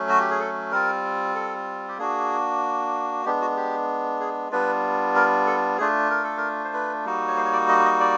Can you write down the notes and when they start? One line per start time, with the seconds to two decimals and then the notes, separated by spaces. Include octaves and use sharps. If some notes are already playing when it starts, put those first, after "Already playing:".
Already playing: F#3 A3 C#4
0.09 F#4
0.20 G4
0.30 G#4
0.40 A4
0.71 G3 C4 F4 A#4
1.35 A4
1.89 G4
1.98 A#3 D4 F#4 G#4
3.25 G#3 B3 D4 G4
3.41 F#4
3.57 G4
4.20 G#4
4.51 G3 B3 D4 F4 B4
5.15 A#4
5.47 A4
5.78 A3 D4 F4 G#4
6.10 A#4
6.24 A4
6.37 A#4
6.64 C5
6.73 B4
7.05 G3 A#3 D#4 F#4
7.28 C#5
7.37 C5
7.45 C#5
7.53 D5
7.69 D#5
7.85 D#5
8.00 D5